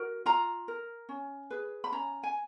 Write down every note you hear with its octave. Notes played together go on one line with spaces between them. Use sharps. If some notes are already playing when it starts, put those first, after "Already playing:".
Already playing: F#4 A#4
F4 A#5
A#4
C#4
G#4 B4
B5
C#4 A#5
G#5